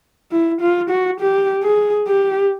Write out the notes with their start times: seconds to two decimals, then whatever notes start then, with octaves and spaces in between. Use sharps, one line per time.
0.32 E4
0.61 F4
0.90 F#4
1.20 G4
1.63 G#4
2.07 G4